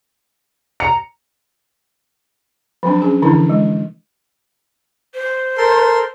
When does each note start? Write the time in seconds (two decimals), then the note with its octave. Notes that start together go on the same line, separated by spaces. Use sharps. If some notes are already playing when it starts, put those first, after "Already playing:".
0.80 A#5 C#7
2.83 F3 F#3 C4 D4
3.02 C#4 G#4
3.22 D3 E3 F3 D4 E4
3.50 G#3
5.14 C5
5.58 A4 A#4 C6